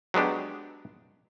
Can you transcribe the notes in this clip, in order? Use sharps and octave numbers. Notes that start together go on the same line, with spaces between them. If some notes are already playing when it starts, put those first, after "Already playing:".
F#3 G#3 B3 D4 G4